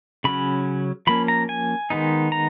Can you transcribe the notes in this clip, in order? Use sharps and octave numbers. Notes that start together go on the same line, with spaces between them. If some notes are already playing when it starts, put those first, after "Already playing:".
C#3 F#3 C#4 B5
F3 A#3 C#4 B5
A#5
G#5
D#3 G#3 B3 D#4
A#5